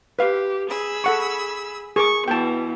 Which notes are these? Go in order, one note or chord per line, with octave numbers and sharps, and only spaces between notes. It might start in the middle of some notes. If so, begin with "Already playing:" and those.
G4 B4 F5
G#4 B5 E6
A4 F#5 C#6
G#4 A#4 C#6 D6
B2 E3 G5 A5